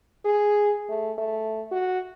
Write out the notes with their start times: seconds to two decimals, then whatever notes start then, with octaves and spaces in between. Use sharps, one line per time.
0.25 G#4
0.89 A3
1.18 A3
1.71 F#4